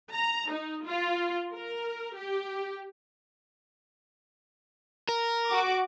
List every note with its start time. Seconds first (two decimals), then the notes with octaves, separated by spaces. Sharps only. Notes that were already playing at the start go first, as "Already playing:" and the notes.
0.12 A#5
0.51 D#4
0.86 F4
1.54 A#4
2.16 G4
5.09 A#4
5.48 F#4 D6